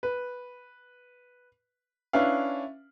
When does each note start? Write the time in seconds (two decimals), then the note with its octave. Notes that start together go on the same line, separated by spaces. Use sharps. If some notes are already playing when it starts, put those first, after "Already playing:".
0.03 B4
2.13 C#4 D4 E4 B4 F5